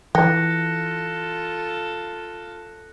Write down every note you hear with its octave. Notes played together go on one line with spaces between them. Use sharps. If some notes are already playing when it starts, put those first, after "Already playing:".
E3 F4 A4 G5 F#6 A#6 C#7